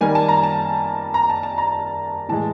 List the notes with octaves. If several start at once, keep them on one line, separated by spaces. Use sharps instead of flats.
D#3 G3 A#3 G#5
A5
A#5
A5
A#5
A5
A5
A#5
A2 E3 G#3 A5